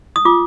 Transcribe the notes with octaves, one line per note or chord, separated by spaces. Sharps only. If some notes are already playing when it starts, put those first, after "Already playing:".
D#6
F4 D6